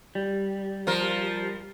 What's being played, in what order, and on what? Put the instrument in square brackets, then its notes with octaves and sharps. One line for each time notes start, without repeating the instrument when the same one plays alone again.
[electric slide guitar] G3
[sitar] F3 A#4